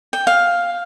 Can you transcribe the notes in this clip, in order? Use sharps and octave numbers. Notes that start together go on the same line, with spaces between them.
G5
F5